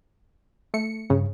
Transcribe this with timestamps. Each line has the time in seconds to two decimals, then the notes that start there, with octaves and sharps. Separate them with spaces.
0.74 A3 C#7
1.10 G2 C#3